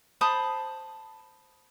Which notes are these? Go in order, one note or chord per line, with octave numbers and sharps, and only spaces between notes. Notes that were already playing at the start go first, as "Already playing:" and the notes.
C5 A5 B5 D#6